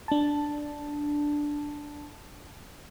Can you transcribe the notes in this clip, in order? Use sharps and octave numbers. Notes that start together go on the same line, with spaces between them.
D4 A5